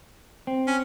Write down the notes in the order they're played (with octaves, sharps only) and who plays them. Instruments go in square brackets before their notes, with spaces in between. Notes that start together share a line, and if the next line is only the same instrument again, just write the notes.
[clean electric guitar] C4
[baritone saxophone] C#4